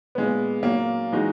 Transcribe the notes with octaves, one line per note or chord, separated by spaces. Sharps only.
A#2 G#3 B3
A#2 F#3 A#3
E3 G#3 D#4 F#4